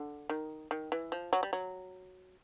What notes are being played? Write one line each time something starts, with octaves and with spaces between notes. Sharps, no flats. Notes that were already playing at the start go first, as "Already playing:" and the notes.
Already playing: D3
D#3
D#3
E3
F3
F#3
G3
F#3